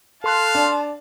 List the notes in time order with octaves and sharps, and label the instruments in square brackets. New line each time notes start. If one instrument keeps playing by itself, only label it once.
[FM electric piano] A4 C6 F#6 [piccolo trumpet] F5 [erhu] A5
[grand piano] D4